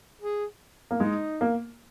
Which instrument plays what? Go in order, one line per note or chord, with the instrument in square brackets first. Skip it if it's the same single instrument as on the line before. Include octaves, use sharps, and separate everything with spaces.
[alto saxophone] G#4
[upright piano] A#3
[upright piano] G#3 [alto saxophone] D#4
[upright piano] A#3